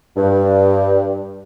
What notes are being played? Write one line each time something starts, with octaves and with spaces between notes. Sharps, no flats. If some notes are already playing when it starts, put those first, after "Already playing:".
G2